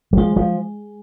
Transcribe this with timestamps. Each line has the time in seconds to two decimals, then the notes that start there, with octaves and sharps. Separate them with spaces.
0.13 G3
0.17 F3 G#3
0.36 F3